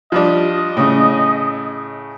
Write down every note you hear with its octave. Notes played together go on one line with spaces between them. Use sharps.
F3 G3 D4 D#5
A2 C#3